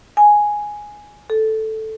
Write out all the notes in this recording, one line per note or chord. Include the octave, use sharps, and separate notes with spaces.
G#5
A4